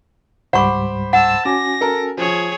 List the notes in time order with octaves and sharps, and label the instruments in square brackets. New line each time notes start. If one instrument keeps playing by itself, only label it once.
[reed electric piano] C#2 G#2 G3 [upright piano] C5 B5 D6 [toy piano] F#5 C#6
[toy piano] F#5 [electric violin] A5 E6
[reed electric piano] C#4 F#4 G#5 [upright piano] D6 [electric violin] A#6
[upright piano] A4 A#4
[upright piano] F3 [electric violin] G#4 C#5